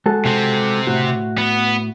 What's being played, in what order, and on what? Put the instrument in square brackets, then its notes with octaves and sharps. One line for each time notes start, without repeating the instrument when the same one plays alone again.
[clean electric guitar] G#3 F#4 A4
[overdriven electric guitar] C3 C4
[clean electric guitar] A2 F#4
[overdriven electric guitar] B3